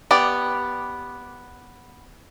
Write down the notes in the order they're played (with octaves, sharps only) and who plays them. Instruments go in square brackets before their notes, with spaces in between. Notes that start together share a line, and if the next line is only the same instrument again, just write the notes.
[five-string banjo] B3 G4 D5